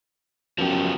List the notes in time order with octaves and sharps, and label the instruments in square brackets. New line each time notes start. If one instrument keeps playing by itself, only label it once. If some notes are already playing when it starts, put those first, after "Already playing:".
[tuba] F#2 [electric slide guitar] F3 B3 G4